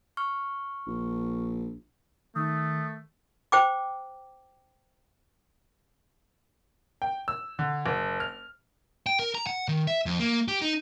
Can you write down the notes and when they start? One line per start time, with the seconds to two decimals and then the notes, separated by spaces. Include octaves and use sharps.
0.17 C#6 F6
0.87 A#1
2.36 D#3 A3 D#6
3.52 C5 G5 D6
7.02 G5
7.28 E6
7.59 D3
7.86 F#1
8.20 F6
9.06 G5
9.19 A#4
9.35 A#5
9.47 F#5
9.68 D#3
9.87 E5
10.06 F2
10.20 A#3
10.48 G4
10.62 D#4